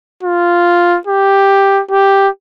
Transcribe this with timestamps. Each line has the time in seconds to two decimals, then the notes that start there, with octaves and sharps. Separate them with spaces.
0.23 F4
1.07 G4
1.91 G4